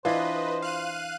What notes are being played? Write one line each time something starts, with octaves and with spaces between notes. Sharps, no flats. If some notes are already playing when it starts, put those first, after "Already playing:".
E3 D4 F4 B4 C5 D#5
F5 F#6 D#7